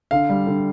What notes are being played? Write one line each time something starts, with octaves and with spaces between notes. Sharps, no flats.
D3 F5
G3
D3